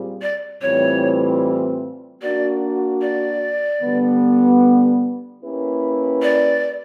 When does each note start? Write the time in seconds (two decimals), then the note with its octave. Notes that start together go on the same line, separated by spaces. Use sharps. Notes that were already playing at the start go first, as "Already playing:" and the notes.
Already playing: A#2 G3 C4 F4 G#4
0.22 D5
0.61 A2 E3 G3 C4 F4 C#5
2.22 A#3 D4 F#4 D5
3.01 D5
3.82 D3 G3 B3
5.43 A#3 C#4 E4 G4 B4
6.22 D5